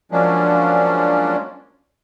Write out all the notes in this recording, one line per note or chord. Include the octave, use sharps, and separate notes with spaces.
F3 F#3 G#3 A#3 C#4 D4